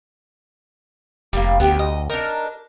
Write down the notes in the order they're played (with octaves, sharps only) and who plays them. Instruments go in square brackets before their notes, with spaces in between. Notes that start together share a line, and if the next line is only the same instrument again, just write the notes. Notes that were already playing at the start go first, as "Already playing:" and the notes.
[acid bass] F1 [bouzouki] G3 A#3
[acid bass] D2 [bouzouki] B3 G4
[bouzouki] D#5
[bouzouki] D4 D#4 [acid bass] A#4